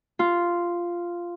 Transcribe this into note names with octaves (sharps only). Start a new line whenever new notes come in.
F4